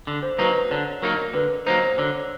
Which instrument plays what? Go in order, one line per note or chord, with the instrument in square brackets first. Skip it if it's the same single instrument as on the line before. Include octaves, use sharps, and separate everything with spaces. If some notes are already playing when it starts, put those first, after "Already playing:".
[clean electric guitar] D3
[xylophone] C5
[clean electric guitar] F#3 A#3 D#4 [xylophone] B4
[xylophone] B4
[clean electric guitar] D3 [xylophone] C#5
[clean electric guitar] F#3 A#3 D#4 [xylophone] A#4
[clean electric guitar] D3 [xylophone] B4
[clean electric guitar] F#3 A#3 D#4 [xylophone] C5
[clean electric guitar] D3 [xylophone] C#5